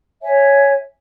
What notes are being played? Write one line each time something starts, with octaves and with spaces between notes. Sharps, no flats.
C#5 E5 G#5